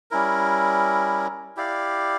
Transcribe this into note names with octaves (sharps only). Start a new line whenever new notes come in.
G3 C#4 E4 A#4
E4 G4 D5 F5